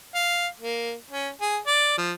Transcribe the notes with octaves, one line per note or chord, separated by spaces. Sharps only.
F5
A#3
C#4
G#4
D5
F3